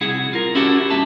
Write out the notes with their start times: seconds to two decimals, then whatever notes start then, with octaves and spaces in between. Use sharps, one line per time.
0.01 C2 E4 G#4 F#5
0.33 F4 A#4
0.55 C#4 E4 F#4 G4 A4 F#5
0.90 G2 B3 E5 A5